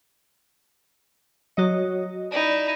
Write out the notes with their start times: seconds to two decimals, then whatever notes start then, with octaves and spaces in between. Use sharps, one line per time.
1.57 F#3 F#4 C#5 D#5
2.32 D#4 E4 D5